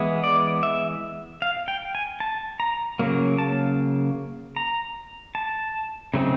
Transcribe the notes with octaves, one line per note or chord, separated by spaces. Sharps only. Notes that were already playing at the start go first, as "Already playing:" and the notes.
Already playing: E3 G#3 B3 E4
D5
E5
F5
G5
G#5
A5
A#5
C#3 F#3 A#3
A5
A#5
A5
C#3 F#3 A3 C4 D#4